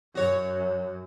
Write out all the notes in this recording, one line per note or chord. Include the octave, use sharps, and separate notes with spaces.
F#2 F#4 C#5